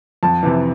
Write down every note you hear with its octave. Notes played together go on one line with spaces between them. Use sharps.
F2 A5
C3 E3